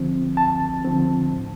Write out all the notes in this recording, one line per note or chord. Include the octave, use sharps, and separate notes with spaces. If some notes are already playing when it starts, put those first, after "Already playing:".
Already playing: D2 D3 F3 C4
D2 A5
D3 F3 C4
A2